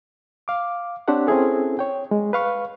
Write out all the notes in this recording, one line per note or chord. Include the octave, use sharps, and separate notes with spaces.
F5 D6
C4 D4 G4 C5 C#5 F#5
C4 C#4 E4 G#4 A4
C#5 G5
G#3
B4 F5 C#6